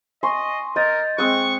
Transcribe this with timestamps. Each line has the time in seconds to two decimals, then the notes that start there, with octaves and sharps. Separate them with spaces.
0.23 D#5 G#5 C6 C#6
0.76 A#4 D#5 D#6 G6 A6
1.18 G#3 C4 C#6 D#6 F#6